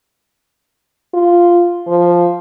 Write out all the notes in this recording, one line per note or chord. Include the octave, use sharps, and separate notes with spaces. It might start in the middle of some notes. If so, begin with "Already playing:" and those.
F4
F3